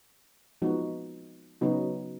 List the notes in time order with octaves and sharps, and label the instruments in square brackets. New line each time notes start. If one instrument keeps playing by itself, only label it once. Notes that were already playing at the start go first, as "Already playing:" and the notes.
[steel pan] F3 G#3 B3 D#4 F#4
C#3 F#3 B3 D#4 F#4